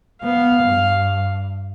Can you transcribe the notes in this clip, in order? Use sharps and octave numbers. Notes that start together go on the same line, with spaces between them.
B3 F5
G2